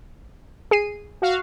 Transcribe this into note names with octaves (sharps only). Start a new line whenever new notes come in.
G#4 C7 D#7
F#4 F5